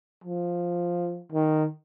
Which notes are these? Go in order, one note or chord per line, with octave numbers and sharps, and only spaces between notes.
F3
D#3